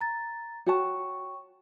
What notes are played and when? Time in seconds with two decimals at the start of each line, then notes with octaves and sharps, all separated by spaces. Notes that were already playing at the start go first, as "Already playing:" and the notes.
0.01 A#5 A6
0.66 F#4 C#5 F#5 G5 A5 C#6